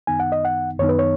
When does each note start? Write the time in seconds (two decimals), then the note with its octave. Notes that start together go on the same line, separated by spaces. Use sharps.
0.07 F#2 D#3 B3 D#4 G#5
0.20 F#5
0.32 D#5
0.45 F#5
0.79 F#2 D#3 B3 D#4 C#5
0.89 B4
0.99 C#5